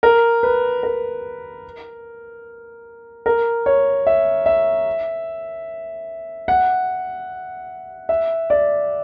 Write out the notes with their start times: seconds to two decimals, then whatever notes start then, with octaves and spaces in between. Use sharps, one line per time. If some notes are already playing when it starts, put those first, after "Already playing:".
0.03 A#4
0.43 B4
0.83 A#4
3.26 A#4
3.66 C#5
4.07 E5
4.46 E5
6.48 F#5
8.09 E5
8.50 D5